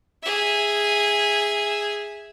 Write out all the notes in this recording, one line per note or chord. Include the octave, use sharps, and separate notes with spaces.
G#4 E5